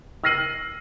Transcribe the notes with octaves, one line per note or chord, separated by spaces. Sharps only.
E6 F6 A#6 C7 D#7 F#7